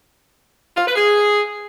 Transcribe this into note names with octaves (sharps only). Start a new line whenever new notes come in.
F4
B4
G#4